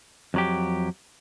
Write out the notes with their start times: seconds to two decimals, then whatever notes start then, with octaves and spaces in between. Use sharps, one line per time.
0.34 F2 F#3 G4